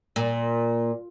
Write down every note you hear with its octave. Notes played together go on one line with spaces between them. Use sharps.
A#2